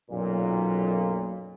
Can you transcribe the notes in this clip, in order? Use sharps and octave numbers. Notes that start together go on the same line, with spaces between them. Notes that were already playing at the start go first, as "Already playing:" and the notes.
B1 F#2 A#2